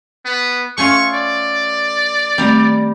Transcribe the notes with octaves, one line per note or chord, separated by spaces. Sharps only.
B3
A3 C#4 F4 C#6
D5
D#3 G3 A3 C4 A#5